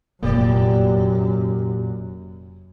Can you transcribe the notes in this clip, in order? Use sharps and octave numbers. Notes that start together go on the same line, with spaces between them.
F1 F#2 A#2 A#3 G4 D5